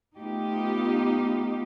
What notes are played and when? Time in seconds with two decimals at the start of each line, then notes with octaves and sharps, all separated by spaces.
0.19 A3 B3 D#4 F4 G4